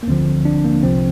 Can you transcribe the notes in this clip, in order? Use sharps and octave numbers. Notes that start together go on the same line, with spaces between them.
A#3
D2 D3 F3 C4
D4
A#3
C2 C3 F3 C4